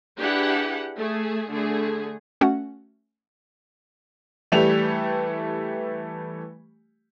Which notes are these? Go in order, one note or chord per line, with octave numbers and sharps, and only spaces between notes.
D4 E4 G4 G#4 B4 F#5
A3 G#4
D3 A3 G#4
A3 C#4 F#4 F#5
E3 G3 A3 G4 F7